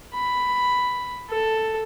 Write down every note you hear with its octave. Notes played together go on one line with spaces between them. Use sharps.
B5
A4